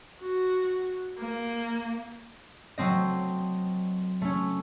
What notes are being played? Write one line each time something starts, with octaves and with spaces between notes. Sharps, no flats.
F#4
A#3
F#3 A3 C4 D#5
A3 C#4